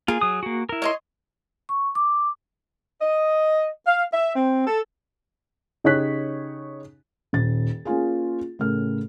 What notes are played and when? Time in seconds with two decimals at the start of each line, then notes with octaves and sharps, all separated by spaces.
0.08 A#3 F4 G#4
0.21 F#3 D#6
0.43 A#3 F#4
0.69 E4 A#4
0.82 C#5 D#5 C6
1.69 C#6
1.95 D6
3.01 D#5
3.87 F5
4.12 E5
4.35 C4
4.67 A4
5.84 C#3 D#4 G4 C#5 F#6 B6
7.33 D#1 A6
7.85 A#3 C#4 F4 G#4
8.59 A2 C#3 A#4 F6